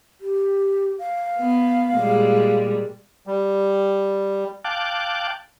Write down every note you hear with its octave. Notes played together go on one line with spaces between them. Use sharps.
G4
F5
B3
A#2 G3 G#3
G3
F5 G5 A5 D6 F#6